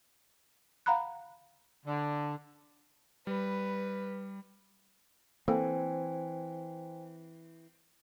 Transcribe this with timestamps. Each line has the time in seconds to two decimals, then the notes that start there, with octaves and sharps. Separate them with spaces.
0.86 F5 F#5 A#5 B5 F#6
1.86 D3
3.27 G3 B4
5.48 E3 A#3 C4 A4 C5 G5 G#5